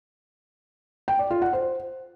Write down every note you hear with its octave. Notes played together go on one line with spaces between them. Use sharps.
G5
D5
F4
F#5
C5